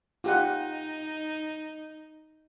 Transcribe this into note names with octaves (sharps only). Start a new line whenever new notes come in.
D#4 F4 G4 F#5